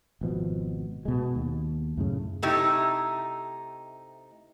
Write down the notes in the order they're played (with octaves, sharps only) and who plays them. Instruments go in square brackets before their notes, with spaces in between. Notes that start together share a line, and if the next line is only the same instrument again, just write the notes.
[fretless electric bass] G#1 B2 F3
B2 G#3
D#2
F#2 A2 C#3
[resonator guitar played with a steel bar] C3 A3 D#4 E4 G4